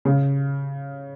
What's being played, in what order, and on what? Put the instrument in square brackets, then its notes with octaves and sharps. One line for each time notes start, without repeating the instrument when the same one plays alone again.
[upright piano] C#3